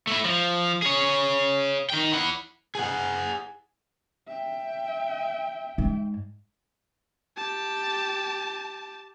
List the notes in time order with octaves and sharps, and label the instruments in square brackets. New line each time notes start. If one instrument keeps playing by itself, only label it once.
[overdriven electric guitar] A3 E4
F3
G#4 C#5
D#3 G5
E4 F#5
G#4 F#5
[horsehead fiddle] E5 G5
[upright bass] G#2
[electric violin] G4 A5